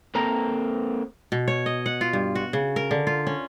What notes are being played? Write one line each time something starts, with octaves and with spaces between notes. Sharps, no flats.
A#3 C4 A4 A#5
B2
C#5
D#5
F#5
F4
G2
F#4
C#3
A#4
D3
F4
C#4